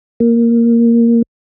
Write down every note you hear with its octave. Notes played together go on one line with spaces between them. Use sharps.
A#3